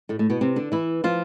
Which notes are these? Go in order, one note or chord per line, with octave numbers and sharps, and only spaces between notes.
A2 A3
A2 A3
B2 B3
C3 C4
D3 D4
E3 E4
F3 F4